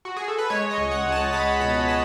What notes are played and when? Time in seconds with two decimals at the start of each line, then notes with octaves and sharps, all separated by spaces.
0.05 F#4
0.17 G#4
0.28 A4
0.38 B4
0.50 G#3 C#5
0.71 D#5
0.77 C#2
0.91 F#5
1.05 C#2
1.12 A5
1.33 G#3 B5
1.60 B2 B5
1.88 G#3 A5